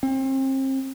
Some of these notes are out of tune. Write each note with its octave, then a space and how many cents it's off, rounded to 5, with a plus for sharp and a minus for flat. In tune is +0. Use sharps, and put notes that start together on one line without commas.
C4 +35